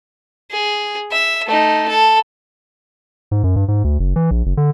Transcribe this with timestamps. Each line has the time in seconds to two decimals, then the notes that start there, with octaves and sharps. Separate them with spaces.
0.51 G#4
1.12 E5
1.47 A3 D#4
1.89 A4
3.31 G#2
3.43 F#2
3.56 G2
3.68 G#2
3.84 D2
4.00 F#1
4.16 E3
4.31 A#1
4.46 F#1
4.57 D3